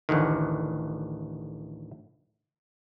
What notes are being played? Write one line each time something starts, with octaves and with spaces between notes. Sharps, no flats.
A1 D2 A2 D#3